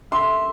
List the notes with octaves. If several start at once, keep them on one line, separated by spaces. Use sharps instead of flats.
E5 C6